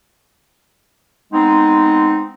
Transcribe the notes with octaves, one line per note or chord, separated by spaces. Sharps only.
G#3 B3 C4 D#4